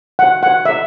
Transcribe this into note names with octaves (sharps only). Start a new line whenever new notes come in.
F#5
F#5
E5